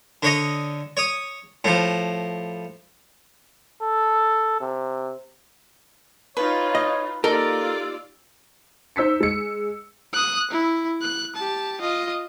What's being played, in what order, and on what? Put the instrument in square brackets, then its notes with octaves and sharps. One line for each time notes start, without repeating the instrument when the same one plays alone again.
[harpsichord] D3 C#5 D#5
C#5 D#6
A2 F3
[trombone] A4
C3
[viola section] D#4 F4 [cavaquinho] B4 [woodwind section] C#5
[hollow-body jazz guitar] D#5
[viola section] A#3 F4 D5 [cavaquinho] D#4 [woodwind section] G4 E6 [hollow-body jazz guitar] A4 A#4
[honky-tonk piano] D#4 C5 E6 B6 C#7
G#3 C#7
[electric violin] D#6 F#6
E4
F#6
G4 A5
F4 D#5